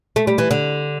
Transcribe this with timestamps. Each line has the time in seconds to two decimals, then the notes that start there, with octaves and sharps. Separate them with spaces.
0.16 A3
0.27 G3
0.38 E3
0.51 D3